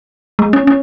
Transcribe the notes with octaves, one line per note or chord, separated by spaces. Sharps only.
G#3
C#4
C#4